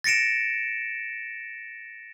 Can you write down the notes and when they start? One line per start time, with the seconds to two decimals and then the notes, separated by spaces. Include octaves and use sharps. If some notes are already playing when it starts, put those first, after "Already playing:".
0.04 A6 A#6 C#7 D7 E7